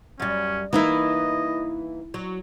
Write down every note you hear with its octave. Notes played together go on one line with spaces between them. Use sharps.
F#2 G3 C#4
E3 A#3 D#4 E4 D#5
F#3